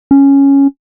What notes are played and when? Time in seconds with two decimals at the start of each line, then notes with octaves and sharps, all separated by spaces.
0.11 C#4